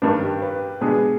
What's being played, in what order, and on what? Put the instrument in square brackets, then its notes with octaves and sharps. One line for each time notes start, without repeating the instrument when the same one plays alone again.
[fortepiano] G2 D#3 G3 D4 [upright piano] B4
[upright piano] G4
B4
[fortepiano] B2 G#3 B3 D4 [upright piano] G#4